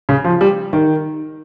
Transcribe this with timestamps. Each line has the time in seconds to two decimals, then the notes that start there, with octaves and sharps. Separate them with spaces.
0.09 C#3
0.24 F3
0.41 G3
0.73 D#3